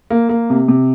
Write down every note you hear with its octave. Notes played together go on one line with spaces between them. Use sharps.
A#3
A#3
C3
C3